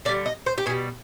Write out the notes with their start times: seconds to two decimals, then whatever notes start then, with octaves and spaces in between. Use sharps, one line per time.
0.05 D3 D5
0.09 G3
0.26 D#5
0.46 C5
0.58 G4
0.66 B2 G#4
0.70 G3